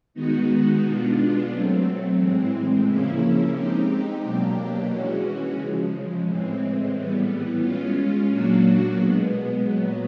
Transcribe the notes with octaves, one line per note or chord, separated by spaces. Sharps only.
D#3 G#3 B3 D#4 F#4
B2 G#3 B3 D4 F4
F#3 A3 C4
A2 E3 G#3 C4
C#3 F3 A#3 C#4 E4
G#3 C4 D#4 G4
B2 F#3 A#3 D4 G4
E3 G#3 C#4 F#4
C#3 F3 G#3
A2 E3 G#3 C4
A2 E3 G3 B3
G#3 C#4 F4
A#2 F#3 A#3 D4 F#4
B2 G#3 B3
A#2 F#3 B3